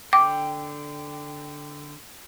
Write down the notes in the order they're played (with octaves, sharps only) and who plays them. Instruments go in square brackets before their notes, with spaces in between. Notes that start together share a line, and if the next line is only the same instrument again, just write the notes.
[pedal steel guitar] D3 G5 [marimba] D6